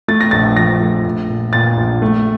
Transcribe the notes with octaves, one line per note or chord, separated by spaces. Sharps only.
A3 A6
A#6
A#1 A6
F3 A#6
A3
A#1
A#2
A#2 A6
A#1
A3